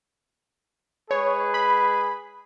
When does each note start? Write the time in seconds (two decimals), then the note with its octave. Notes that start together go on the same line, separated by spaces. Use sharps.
1.11 G#3 G#4 B4 C#5
1.54 B5